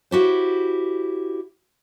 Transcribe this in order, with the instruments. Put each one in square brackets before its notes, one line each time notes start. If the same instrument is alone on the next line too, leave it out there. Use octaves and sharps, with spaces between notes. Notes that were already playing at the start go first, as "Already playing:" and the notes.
[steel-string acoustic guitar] E4 F#4 G4 C5